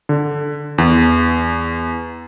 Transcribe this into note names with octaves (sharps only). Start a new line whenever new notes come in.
D3
E2